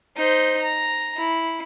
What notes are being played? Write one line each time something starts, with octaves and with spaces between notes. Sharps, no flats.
D#4 C5
A#5
E4